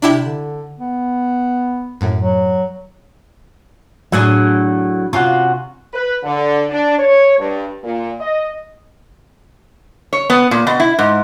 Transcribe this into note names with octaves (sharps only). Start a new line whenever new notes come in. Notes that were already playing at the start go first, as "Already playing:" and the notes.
C3 D4 E4 G4
D3
B3
F#2 A2
F#3
A2 F#3 D4 G#4
C3 C#4 F4 F#4
B4
D3
D4
C#5
G2
A#2
D#5
C#5
B3
A#2
B2
E4
G#2